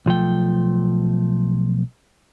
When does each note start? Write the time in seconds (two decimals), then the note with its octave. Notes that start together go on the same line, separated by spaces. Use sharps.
0.06 B1 F3 A3 G5